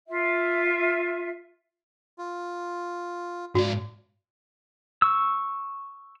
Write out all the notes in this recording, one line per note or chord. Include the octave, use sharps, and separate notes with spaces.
F4 E5
F4
G#2 F#4 D5
C#6 E6